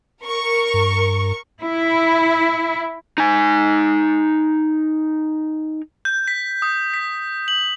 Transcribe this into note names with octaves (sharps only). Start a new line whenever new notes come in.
A#4 C#6
G2
E4
D#4 G#5
G6
B6
D#6
B6
F#7